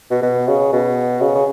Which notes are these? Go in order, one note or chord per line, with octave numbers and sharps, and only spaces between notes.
B2
B2
C#3
B2
C#3
C#3